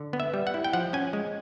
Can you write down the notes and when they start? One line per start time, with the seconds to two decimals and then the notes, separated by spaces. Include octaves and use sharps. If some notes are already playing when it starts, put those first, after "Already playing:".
Already playing: D3
0.13 B3
0.20 E5
0.34 G3
0.47 F#5
0.54 E4
0.64 G5
0.73 F3 F#5
0.93 C#4 G#5
1.13 G#3